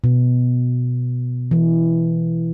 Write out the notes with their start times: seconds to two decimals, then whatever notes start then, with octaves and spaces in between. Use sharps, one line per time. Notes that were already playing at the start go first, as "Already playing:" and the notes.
0.04 B2
1.51 E3